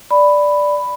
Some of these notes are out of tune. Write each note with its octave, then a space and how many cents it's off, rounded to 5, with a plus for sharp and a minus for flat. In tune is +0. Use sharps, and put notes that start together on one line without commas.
D5 +0 B5 +5